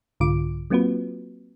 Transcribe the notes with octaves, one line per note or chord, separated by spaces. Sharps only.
C2 G#2 D3 F4 D6 D7
F#3 A#3 C4 F4 F#4 B4